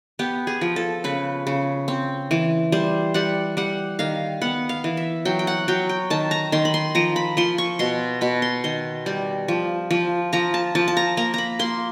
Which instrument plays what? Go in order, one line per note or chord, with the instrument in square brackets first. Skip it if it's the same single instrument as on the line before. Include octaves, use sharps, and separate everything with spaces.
[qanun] B3 G4
G#4
F3
A4
C#3 B4
C#3
C4
E3
G3 C5
G3 F#5
G3 F#5
D#3 F5
B3 F#5
F5
E3
E5
F#3 G5
G5
F#5
F#3 G5
G5
D#3 A5
A#5
D#3 C6
B5
C6
F3 A#5
B5
F3 C6
C#6
B2 C6
B2 B5
C6
D#3 C6
G3
F3
F3
F3 A#5
A5
F3 A5
A5
A#5
A#3 A#5
A#5 B5
A#3 C6